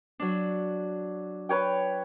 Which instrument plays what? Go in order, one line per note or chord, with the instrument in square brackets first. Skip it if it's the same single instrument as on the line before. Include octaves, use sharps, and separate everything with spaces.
[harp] F#3 D4
[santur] B4 C#5 G5